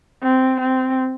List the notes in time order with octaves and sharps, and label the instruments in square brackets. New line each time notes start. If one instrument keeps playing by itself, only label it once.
[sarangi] C4
C4